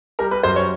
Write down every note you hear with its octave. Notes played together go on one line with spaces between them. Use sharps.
G3 A#4
B4
F#2 C5
C#5